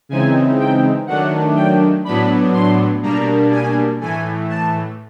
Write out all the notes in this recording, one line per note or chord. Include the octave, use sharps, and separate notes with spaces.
C#3 E3 G#3 C4 D#4 G#5
G5
D#3 F#3 A3 D4 F#5
G5
A2 F#3 B3 D4 B5
C6
B2 G3 A#3 D4 A#5
G#5
A2 E3 A3 G#5
A5